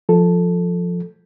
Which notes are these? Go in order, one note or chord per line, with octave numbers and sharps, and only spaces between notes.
F3 A4